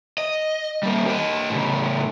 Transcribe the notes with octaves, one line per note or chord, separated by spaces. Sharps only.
D#5
G3 A#3
G4 D#5
A2 C#3